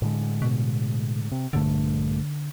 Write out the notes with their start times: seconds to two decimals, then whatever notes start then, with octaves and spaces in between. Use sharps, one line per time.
0.02 A2 D3 G#3
0.42 B2
1.32 C3
1.53 A#1 G2 D3 A3